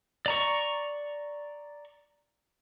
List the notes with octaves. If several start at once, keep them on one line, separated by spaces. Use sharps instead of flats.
D5 A#5 C#6